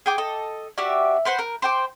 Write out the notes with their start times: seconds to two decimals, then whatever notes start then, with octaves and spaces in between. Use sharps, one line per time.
0.06 G#4 G5 D6
0.18 A4 D#5
0.78 D4 F#4 G4 E5
1.25 B4 C5 F#5 C6
1.39 A#4
1.62 C5 G5 D6